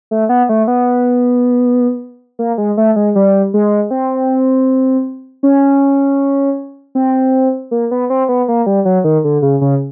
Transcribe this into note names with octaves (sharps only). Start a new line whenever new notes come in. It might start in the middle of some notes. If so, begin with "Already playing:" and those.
A3
B3
A3
B3
A#3
G#3
A3
G#3
G3
G#3
C4
C#4
C4
A#3
B3
C4
B3
A#3
G3
F#3
D#3
D3
C#3
C#3